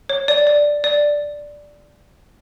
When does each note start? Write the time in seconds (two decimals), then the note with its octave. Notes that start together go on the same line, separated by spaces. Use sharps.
0.09 C#5
0.28 D5
0.47 D5
0.84 D5